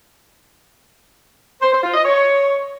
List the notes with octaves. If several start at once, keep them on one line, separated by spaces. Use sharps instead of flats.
C5
C5
F4
D#5
C#5